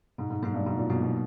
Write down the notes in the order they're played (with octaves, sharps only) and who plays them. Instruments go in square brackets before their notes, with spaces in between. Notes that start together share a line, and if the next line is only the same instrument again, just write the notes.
[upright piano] G#2 [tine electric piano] B2
[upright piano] G#2
[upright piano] G#2 [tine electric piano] F#3 A#3 D#4
[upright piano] G2
[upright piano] G#2 [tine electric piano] B2
[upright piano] A#2
[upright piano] B2 [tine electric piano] F#3 A#3 D#4
[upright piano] B2